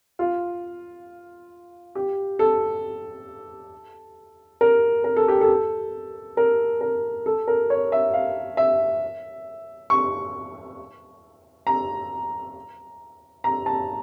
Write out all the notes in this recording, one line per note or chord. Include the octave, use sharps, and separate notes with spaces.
F4
G4
A4
A#4
A#4
A4
G4
A4
A#4
A#4
A4
A#4
C#5
E5
F5
E5
C#6
A#5
A#5
A5